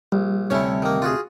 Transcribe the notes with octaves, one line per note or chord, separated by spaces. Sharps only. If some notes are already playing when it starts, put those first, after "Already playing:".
A#1 G3
D2 C3 C#4 E4 C#5
D#3 A#3
F4 F#4 G#4